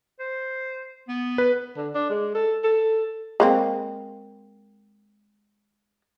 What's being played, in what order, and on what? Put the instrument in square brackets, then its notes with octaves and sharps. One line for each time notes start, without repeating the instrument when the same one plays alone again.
[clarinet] C5
B3
[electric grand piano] B4
[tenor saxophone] D3
D4
G#3
A4
A4
[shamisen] G#3 A#3 C4